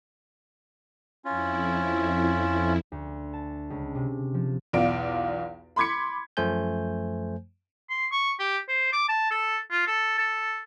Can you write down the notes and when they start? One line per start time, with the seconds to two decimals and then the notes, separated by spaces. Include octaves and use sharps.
1.25 F2 C#4 E4 F4
2.92 D2
3.33 A5
3.70 C#2
3.95 C3
4.34 F3
4.73 B1 E2 F4 D5 D7
5.76 B5 C6 D6 G#6 B6 C#7
6.37 F#2 F3 A3 C5 G#5 G6
7.90 C6
8.12 C#6
8.39 G4
8.69 C5
8.93 D6
9.09 A5
9.31 A4
9.71 F4
9.87 A4
10.18 A4